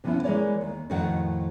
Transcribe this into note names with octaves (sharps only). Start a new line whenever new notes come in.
C3 E3 F3 B3 C#4 E4
E3 G#3 E4 A#4 C#5 D5
D#2
F2 A2 D#3 F#4 C5 F#5